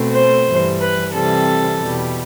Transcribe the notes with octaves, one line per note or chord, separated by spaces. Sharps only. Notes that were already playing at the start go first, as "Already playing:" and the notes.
Already playing: B2 A3 C4
C5
G2 E3 G3
B4
C3 E3 G3 C4 A4
E2 B2 G3